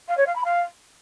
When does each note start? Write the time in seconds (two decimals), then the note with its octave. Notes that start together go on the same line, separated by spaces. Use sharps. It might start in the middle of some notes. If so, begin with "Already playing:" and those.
0.08 F5
0.17 C#5
0.26 F5
0.35 B5
0.44 F5